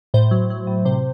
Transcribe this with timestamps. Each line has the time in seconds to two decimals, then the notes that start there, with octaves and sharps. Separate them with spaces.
0.14 A2 C5
0.31 F#3
0.50 F#3
0.67 A2
0.85 C3 C5